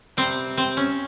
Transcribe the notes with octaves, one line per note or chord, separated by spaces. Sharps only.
C3 G3 C4
C4
C#4